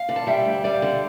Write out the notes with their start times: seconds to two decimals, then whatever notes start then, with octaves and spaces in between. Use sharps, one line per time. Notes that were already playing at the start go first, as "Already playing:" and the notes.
Already playing: F5
0.09 D3
0.16 A5
0.27 G3 E5 G5
0.45 D2
0.64 G3 D5 F5
0.82 D3